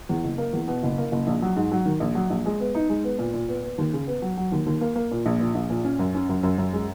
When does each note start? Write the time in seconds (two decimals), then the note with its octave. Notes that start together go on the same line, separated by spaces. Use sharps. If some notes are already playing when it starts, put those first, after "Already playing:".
0.09 E2
0.24 F#1
0.38 A#3
0.53 E2
0.68 B2
0.83 F#1
0.98 A#3
1.12 F#1
1.27 A#1
1.42 F#3
1.56 G#2
1.72 F#3
1.86 D#3
2.00 A#1
2.15 F#3
2.30 A#1
2.46 G#3
2.60 B3
2.75 D#4
2.89 G#3
3.04 B3
3.19 A#2
3.33 A#2
3.49 B3
3.64 B3
3.78 D#2
3.93 C#3
4.07 B3
4.22 F#3
4.37 F#3
4.52 D#2
4.66 D#2
4.81 A#3
4.96 A#3
5.11 A#2
5.26 A#1
5.40 A#2
5.55 A#1
5.70 A#2
5.84 C#4
5.99 F#2
6.14 C#4
6.29 F#2
6.43 F#2
6.58 F#2
6.73 G#3